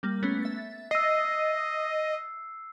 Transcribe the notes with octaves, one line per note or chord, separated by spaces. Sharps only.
G3 A#3
A3 B3 C#4
E5 A6
D#5 E6 C7